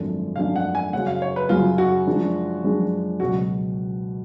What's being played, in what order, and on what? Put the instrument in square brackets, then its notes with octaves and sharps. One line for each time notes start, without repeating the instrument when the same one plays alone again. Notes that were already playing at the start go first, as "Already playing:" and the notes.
Already playing: [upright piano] G#1 F#2 F3 A3 D4
[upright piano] G#1 F#2 F3 A3 D4 [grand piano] F5
[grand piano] F#5
G#5
[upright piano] F#2 C#3 F#3 C#4 F#4 [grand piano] F#5
[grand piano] F5
C#5
B4
[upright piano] F#2 C#3 F#3 C#4 F#4 [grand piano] F4
[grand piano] F#4
[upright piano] F#2 F3 G#3 D4 F4
F#2 F3 G#3 D4 F4
[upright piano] C#2 B2 F#3 [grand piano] F#4